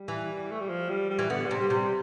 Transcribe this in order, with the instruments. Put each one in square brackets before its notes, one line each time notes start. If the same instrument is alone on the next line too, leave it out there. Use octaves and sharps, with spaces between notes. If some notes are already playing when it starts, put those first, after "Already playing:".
Already playing: [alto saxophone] G3
[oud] E3
[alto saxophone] A3
G3
F3
G3
G3
[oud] E3
[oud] D3 [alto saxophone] B3
[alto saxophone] G3
[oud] C3
[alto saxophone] G3
[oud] C3
[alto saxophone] G3